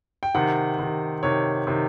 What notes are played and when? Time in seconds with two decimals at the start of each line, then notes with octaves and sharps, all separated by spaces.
0.23 G5
0.35 C3 D#3 F#5
0.79 C3 D#3
1.23 C3 D#3 C#5
1.67 C3 D#3